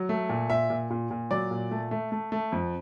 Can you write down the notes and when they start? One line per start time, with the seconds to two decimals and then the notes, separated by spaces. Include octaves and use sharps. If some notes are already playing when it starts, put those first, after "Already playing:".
Already playing: F#3
0.09 A3
0.29 A#2
0.50 A#2 E5
0.70 A#2
0.90 A#2
1.11 A#2
1.31 F#3 D5
1.51 A#2
1.71 A3
1.91 A3
2.12 A3
2.32 A3
2.52 F2